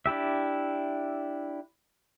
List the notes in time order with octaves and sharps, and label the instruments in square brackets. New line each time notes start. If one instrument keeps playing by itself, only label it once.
[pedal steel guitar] D4 E4 G4 E5